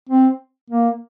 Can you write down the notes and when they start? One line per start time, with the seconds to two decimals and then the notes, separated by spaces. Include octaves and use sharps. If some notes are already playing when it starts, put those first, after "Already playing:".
0.09 C4
0.70 A#3